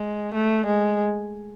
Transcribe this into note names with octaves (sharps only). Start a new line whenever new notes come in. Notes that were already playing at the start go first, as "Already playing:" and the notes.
Already playing: G#3
A3
G#3